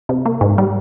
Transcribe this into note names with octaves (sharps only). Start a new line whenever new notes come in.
C3
A#3
G#2
G3